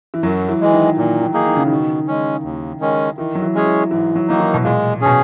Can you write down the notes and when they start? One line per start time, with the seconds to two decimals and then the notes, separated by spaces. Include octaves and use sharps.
0.14 E3
0.23 F#2 F#3
0.49 E3
0.61 E3 G#3
0.73 D#3
0.97 A#2 D#3
1.21 D#3
1.34 A#3 D#4 G#4
1.46 D#3
1.56 C#3
1.67 B2 D#3
2.07 G#3 C#4
2.43 D#2
2.80 D#3 G#3 C#4
3.17 D#3 E3
3.35 F#3
3.42 E3
3.55 G#3 C#4 G#4 C#5
3.66 E3
3.91 G#2 E3
4.15 F#3
4.28 D#3 F#3 A#3 D#4
4.40 E3
4.54 B2
4.64 A#2 G#3
5.01 B2 C#4 G#4